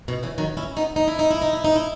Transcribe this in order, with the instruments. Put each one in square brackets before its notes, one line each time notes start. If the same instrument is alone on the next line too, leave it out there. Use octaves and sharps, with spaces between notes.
[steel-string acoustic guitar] B2 D#3
C#3 E3
D#3 F#3
C#4 E4
B3 D#4
D#4
E4
D#4
E4
D#4
E4
D#4
E4